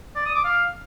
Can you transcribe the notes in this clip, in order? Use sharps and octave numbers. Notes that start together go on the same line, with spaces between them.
D5
D#6
D6
F5